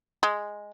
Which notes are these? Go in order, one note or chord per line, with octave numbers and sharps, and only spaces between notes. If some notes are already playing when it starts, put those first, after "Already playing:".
G#3